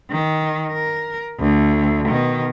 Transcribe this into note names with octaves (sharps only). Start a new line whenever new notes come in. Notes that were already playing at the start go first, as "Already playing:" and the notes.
D#3
A#4
D2
B2 D#3